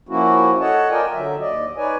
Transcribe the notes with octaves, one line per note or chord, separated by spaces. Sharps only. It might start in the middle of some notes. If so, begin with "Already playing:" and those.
F3 A#3 C#4 E4 F#4
A4 C#5 D#5 F#5 A5
F4 A#4 D5 D#5 G5 G#5
D3 F#3 E5
D#2 D5 D#5
D#4 B4 C#5 D5 G#5